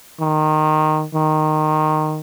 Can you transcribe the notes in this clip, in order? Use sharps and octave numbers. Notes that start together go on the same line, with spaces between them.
D#3
D#3